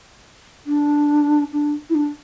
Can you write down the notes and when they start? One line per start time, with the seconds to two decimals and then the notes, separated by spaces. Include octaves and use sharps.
0.66 D4
1.52 D4
1.89 E4
1.94 D4